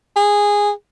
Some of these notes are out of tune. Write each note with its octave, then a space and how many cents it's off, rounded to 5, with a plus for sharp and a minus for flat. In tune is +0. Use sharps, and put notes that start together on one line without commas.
G#4 -10